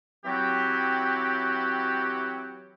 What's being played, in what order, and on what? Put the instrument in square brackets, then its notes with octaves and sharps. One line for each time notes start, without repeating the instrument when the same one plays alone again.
[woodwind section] E3 F#3 C4 F#4 G4